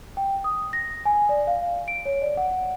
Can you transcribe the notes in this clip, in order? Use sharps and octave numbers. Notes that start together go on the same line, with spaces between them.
G5
D#6
A#6
G#5
D5
F5
D7
C#5
D5
F#5